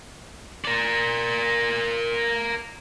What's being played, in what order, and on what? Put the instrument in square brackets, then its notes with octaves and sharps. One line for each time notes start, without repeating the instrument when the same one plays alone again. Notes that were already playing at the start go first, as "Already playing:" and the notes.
[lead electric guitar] A#4 D5